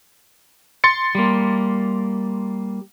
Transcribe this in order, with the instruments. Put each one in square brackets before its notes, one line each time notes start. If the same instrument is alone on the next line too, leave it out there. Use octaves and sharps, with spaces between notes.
[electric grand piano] C6 A6 C#7
[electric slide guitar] G3 A#3